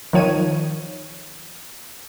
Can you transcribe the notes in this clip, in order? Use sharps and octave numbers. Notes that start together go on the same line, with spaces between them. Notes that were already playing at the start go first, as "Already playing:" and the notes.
D#3 F3 C#5 D#7